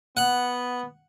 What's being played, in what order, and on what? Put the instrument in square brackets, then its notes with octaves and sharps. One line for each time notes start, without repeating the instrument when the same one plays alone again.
[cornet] B3 [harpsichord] F#5